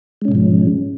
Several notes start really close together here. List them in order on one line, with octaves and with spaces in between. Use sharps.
G#3 C#4 B2 G#2 F3